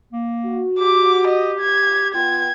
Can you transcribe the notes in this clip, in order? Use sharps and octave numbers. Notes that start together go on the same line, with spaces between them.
A#3
F#4
G4 D6
D#5
G#6
B3 F4 B4 G5 G#6